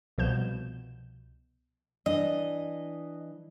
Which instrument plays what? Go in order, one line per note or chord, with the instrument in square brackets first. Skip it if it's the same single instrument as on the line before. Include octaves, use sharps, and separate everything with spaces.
[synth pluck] C2 B2 F3 G6 E7
[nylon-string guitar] E3 D4 [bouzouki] D#5